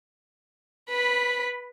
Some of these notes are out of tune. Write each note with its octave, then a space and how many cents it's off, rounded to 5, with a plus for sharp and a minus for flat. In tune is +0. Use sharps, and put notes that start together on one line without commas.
B4 -15 B5 +0